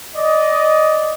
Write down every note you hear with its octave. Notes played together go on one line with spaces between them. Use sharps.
D5 D#5